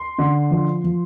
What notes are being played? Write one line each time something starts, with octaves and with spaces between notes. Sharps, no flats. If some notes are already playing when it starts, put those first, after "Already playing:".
Already playing: C6
D3
F3
F3